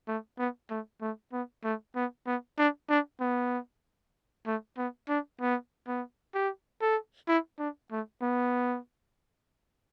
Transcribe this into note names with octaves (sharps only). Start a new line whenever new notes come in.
A3
B3
A3
A3
B3
A3
B3
B3
D4
D4
B3
A3
B3
D4
B3
B3
G4
A4
E4
D4
A3
B3